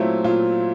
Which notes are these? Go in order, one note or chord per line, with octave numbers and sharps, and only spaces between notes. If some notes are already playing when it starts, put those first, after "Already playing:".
Already playing: A#2 F#3 A3 C4 E4 F4
A#2 F4